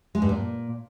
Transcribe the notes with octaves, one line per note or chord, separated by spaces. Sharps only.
G#3
G2
A#2